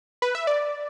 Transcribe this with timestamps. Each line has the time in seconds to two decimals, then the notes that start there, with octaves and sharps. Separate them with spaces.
0.22 B4
0.35 E5
0.47 D5